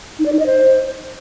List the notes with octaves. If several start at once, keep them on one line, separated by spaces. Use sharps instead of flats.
D#4
D5
D#4
D#5
C5